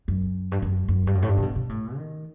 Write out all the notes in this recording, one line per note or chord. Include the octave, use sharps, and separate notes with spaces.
F#2
G2
F#2
F#2
G2
F#2
A2
G2
C3
B2
B2
A2
D#3